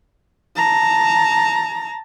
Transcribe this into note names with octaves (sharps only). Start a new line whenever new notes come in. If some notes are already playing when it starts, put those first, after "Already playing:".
A5 A#5